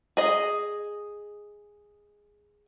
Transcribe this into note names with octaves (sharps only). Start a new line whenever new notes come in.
G#4 D#5